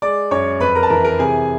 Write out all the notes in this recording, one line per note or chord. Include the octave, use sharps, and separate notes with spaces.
G#3 D5 D6
F#2 C#5 C#6
F2 B4 B5
A#4 A#5
A5
E3 A#4 A#5
A#4 A#5
C3 G#4 G#5